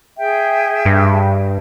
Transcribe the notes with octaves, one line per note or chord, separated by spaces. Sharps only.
G#4 E5 G5
G2